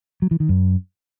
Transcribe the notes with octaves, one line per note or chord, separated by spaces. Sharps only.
F#3
E3
D#3
F#2